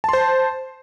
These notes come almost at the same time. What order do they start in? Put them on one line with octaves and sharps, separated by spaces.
A5 C6 C5